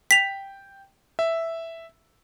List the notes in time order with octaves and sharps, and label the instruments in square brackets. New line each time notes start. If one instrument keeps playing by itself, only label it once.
[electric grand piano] G5 [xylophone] B6 F7
[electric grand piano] E5